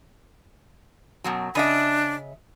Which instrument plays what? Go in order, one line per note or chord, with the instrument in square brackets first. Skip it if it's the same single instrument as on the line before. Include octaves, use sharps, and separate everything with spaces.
[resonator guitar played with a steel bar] F#2 B2 F#3
[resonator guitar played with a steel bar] C#3 D#5 E5 [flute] D4